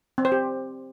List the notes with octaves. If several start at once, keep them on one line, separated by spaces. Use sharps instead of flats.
C4
C5
G4